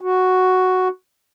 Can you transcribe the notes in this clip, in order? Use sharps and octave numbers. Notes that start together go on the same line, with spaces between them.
F#4